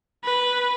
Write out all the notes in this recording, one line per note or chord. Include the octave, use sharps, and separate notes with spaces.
B4